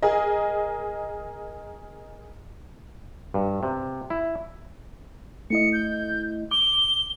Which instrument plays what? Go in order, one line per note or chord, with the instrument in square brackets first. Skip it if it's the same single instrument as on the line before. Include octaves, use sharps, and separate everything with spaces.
[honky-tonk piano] G#4 A#4 D#5
[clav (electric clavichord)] G2
C3
E4
[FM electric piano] A3 E4 D#5 [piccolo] C#7
[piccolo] G6
[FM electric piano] D6 [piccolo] G7